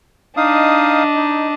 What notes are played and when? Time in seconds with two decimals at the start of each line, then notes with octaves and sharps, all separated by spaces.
0.37 D4 D#4 D#5 F5 D#6
1.15 D#4